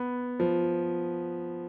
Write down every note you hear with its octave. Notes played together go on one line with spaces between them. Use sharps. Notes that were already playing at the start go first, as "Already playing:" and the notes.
Already playing: B3
F3